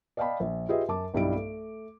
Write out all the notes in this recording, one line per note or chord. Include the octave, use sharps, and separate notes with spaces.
D5 D#5 F5 G5 A5 B5
A#1
F4 G4 G#4 B4 D#5 E5
F#2 A5 D6
B1 G2 G3 D#4 E4 D7
A3